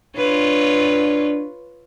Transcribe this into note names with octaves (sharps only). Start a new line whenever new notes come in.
D4 F4 B4 C#5